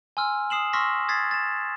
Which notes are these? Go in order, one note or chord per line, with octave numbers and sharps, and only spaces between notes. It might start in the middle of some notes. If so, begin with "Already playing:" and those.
G#5 C6 E6 F6
D#6 C7 E7 F#7
C6 C#6 E6 F6 A#6 B6
D#6 G#6 A6 B6 C7
A6 E7